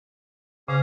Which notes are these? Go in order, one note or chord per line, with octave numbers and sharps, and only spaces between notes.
C#3 C#4 G#4 F5